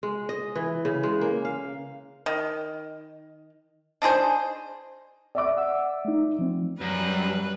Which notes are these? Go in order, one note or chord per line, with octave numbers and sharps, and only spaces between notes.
G#3
D#5
E3
C#3
G#3
A#3
F5
D#3
D4 D#4 G#4 C5
D5 E5 D6
F#5 E6
A3 D#4
F3 C4
F#2 G3 B4